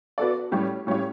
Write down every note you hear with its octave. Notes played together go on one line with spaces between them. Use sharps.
B3 F#4 A4 D5
A2 G3 C#4 G4 C#5
A2 G3 C#4 G4 C#5